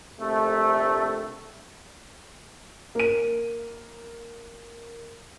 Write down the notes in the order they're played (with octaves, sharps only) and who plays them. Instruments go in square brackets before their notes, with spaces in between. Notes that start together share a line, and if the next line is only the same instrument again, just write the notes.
[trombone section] A#1 C3 A3
[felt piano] A#3 D#7